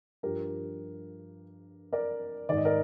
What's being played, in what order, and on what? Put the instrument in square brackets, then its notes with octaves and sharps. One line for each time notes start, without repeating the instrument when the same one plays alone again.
[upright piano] G2 F3 G4 A#4
A#4 D5
G#2 D#3 D5
D#5
A#4 D5